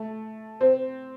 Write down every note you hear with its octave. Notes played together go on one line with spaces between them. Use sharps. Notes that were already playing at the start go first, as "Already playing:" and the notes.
Already playing: A3
C4 C5